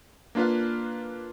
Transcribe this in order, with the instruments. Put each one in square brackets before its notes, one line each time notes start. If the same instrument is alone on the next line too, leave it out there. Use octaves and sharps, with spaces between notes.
[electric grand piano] A#3 D4 F4 B4 F5